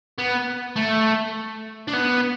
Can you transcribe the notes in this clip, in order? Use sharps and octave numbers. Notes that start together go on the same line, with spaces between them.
B3
A3
D4
B3